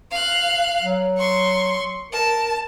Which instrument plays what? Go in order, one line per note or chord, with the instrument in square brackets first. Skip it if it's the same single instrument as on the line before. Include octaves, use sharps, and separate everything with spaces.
[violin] F5 F#6
[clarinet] F#3
[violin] C6 C#6
[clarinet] A#4 [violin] A5